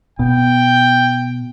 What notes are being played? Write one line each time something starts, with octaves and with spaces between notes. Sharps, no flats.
B2 G5